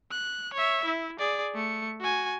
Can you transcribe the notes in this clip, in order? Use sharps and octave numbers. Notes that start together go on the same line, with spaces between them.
F#6
C#5 E5
E4
G#4 D5
A3 C#7
F#4 G#5